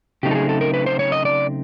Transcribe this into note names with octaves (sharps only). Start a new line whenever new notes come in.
C#3 F#3 A3 C4 D#4 G4
A4
G#4
A4
A#4
B4
C5
C#5
D#5
D5